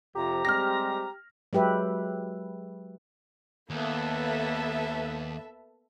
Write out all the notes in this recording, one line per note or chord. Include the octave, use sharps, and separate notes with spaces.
F2 C3 F3 G4 A#5
G3 G#3 C4 F6 A#6
F#3 G#3 G4 B4 E5
D#2 A#3 B3 A4 B4 E5